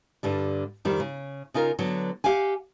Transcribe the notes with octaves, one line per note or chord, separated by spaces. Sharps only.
G2 D3 G3
F2 D#3 G3
C#3
C#3 D#4 F4 A#4
D3 F#3 B3
G4 F5 F#5 G#5